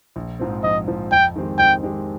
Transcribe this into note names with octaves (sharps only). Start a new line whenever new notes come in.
A#1
G#2 F3 C4
A#1 D#5
G#2 F3 C4
F2 G5
D#3 G#3 C4 G4
F2 G5
D#3 G#3 C4 G4